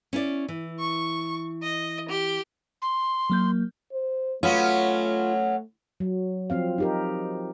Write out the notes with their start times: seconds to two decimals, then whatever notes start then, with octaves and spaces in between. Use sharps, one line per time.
0.13 C#4 E4 D5
0.48 E3
0.80 C#6
1.63 D#5
2.09 G4
2.81 C6
3.30 F#3 A#3 G6
3.93 C5
4.43 F#3 A3 B3 C#4 F4
6.00 F#3
6.50 F3 C4 F5
6.78 D#4 G4 A#4